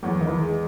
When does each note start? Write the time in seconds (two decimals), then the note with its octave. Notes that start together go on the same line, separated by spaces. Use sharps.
0.03 E2 F#3
0.21 D#3
0.29 E3
0.41 G#3